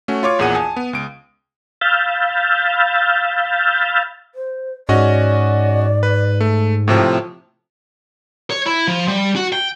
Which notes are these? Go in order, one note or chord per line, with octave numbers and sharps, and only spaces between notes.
A3 C#4 F#4
F4 C#5 D6 C#7
A#1 E2 A#2 G#4 F#5 D#7
G#5 A5 D#6
B3
C#2 D7
F5 B5 E6 F6 G6 A6
C5
G#2 C#4 F#4 D5 D#5
B4
A3
A2 C3 F3
C#5
E4
F3
G3
F#4
G5